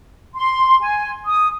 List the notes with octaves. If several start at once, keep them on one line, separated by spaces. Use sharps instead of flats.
C6
G#5
D#6